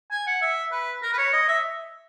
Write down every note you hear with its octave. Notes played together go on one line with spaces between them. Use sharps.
G#5
F#5
E5
B4
A#4
B4
C#5
D#5
E5